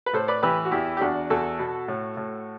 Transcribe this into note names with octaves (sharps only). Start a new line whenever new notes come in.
B4
A2 A4 C5
B4 D5
E3 G4 B4
F#4
E2 E4 G4
G4
E2 D4 F#4
E2 F#4 A4
B2
A2
A2